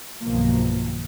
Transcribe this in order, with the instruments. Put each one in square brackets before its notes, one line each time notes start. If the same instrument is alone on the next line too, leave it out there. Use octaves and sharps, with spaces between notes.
[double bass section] B1 G2 B2 D#3 F3 A#3